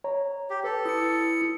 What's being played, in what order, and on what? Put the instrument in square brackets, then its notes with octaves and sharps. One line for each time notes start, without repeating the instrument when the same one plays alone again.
[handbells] C#5 A#5
[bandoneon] G4
[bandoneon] A4 [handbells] B4
[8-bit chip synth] E4 C#7 [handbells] D#6